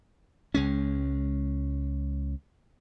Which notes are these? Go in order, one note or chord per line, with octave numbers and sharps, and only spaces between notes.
C#2 G#3 C#4